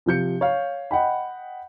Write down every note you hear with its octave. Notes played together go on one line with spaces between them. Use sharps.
C3 F3 G6 C#7
C#5 F5
D#5 F#5 G5 B5